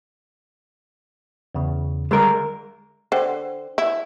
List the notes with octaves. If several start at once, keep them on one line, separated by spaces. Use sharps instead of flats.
E2 C#3
D3 G3 G#3 A#4
D3 C5 G5
E4